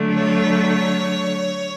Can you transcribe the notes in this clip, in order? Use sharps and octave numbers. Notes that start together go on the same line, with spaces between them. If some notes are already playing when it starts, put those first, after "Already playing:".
Already playing: D3 F#3 A3
C#5